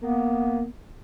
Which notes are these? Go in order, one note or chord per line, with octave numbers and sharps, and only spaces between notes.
A#3 B3